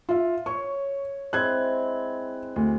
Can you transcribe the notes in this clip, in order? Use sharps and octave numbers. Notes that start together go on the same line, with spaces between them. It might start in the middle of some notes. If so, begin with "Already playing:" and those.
F4 E5
C#5 C#6
G#3 C4 E4 F#6 G#6
D2